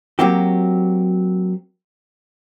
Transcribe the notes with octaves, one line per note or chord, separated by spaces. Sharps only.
F#3 A#3 C4 F#4 G4